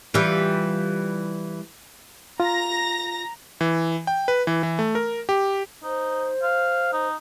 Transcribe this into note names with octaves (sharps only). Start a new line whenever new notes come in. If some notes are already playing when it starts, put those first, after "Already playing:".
E3 G3 F4
F4 A#5 A#6
E3
G5
B4
E3
E3
A3
A#4
G4
D#4 C5
F5
D#4